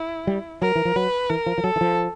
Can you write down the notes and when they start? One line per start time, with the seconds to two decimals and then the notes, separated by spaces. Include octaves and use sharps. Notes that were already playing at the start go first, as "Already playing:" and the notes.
Already playing: E4
0.27 G3
0.62 F#3 A#4
0.76 E3
0.85 F3
0.96 F#3 B4
1.30 E3 A#4
1.46 F3
1.58 F3
1.64 F#3 A4
1.76 E3
1.81 F3